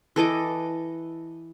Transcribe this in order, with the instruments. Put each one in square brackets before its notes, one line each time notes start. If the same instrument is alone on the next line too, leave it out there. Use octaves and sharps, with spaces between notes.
[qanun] E3 A4 D#5 D6